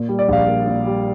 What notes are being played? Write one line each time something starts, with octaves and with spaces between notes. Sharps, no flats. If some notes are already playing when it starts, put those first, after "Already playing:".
Already playing: A#2
G3
D5
A#1 F5
A#3
A#2
G3